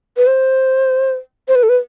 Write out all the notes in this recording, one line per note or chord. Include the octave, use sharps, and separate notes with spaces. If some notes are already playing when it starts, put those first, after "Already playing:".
B4
C5
C5
B4
A4
B4